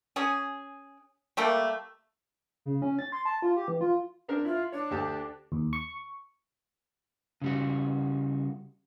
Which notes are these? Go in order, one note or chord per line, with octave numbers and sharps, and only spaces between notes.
C#4 G#4
G3 A3 A#3
C#3
C#4
A6
C6
A5
F4
G4
E3
F4
C4 D4 A#4
E4 F4
D4 C#5
D2 G4 A5
D#2
C#6
C#3 G3 F#4